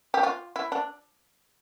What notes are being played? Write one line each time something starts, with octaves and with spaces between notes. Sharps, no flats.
G4
F4
E4
D4